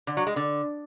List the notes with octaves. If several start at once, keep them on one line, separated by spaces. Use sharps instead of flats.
D3
F#3
G#3
D3